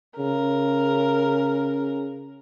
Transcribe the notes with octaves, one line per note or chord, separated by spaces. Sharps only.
C#3 A#4